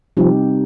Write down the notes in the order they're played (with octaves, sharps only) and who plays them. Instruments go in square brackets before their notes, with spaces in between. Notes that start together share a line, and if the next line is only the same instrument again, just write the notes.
[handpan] C3 G3 C4 D#4 G4 [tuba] F3